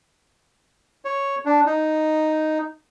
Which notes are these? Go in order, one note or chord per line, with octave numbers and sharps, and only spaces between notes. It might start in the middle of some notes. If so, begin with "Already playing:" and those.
C#5
D4
D#4